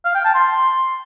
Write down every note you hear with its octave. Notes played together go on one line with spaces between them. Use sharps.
F5
G5
A5
C6